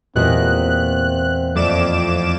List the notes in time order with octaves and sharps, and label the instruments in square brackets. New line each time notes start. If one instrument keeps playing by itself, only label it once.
[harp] E2 G#3 A#3 [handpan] A#2 G4 D#5 [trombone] C4 [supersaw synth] F#6
[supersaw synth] F2 D6 E7 [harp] A3 D5